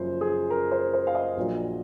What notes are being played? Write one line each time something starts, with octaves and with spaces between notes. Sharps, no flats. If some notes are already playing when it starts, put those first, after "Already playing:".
Already playing: F#1 F#2 F3 C5
G#4
A#4
C5
C5
F5
D#5
A#1 A#2 F#3